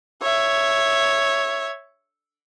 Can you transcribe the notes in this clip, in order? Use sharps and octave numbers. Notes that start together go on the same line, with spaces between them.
C#5 E5